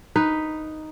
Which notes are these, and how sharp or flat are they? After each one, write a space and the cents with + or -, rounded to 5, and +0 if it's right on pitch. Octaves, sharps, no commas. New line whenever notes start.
D#4 +0 B4 +0